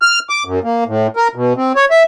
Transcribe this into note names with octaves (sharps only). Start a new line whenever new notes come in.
F6
D6
F#2
A#3
A2
A#4
B2
C4
C#5
E5